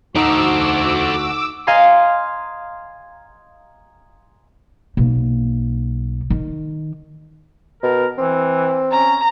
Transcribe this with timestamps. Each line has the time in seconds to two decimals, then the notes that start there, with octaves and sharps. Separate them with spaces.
0.15 D2 D#4 F#4 A4 C5 D6 E6
1.67 D#5 F5 G#5 A#5 C6
4.97 B1 A#3
6.30 D#3
7.83 B2 A#4
8.18 E3 C4
8.91 C#4 A#5